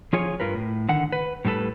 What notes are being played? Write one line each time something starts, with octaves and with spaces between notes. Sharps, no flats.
F3 F4 G#4 C#5
G2 F4 A#4 B4
A2
D3 D#3 F#5
B4
A2 G3 C4 A4 B4